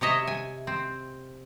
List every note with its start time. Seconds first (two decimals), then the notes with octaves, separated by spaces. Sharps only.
0.01 C3 C#5 D#5 E5
0.27 G#5
0.67 C4